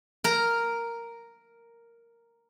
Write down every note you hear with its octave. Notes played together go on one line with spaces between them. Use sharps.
A#4 A#5